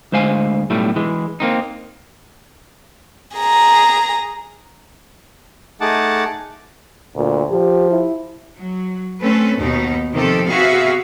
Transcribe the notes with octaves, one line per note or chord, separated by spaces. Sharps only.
D2 G#3 C5 F5 G#5
B1 A2 G3 A3
E3 G#3
A#3 C4 D#4
G#4 A#5
A3 D#4 G#4 F#5 A5 D6
D2 A#2
F3 G4
E4
F#3
A3 C4 C#4 A4 B4
D#2 B2 D#4
C3 D#3 F3 C4 G4 A4
C3 B3 F#4 G#4 E5 F5